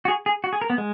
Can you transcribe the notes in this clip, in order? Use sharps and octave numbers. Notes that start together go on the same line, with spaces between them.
F#4
G#4
G#4
F#4
G#4
A#4
B3
G#3